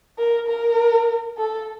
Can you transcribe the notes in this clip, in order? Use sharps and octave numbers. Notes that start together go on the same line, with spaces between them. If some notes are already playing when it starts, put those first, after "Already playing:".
A#4
A#4
A4